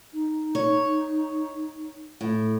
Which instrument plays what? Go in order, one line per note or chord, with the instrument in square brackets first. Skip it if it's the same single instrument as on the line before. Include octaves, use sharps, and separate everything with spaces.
[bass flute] D#4
[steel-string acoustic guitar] C#5
A2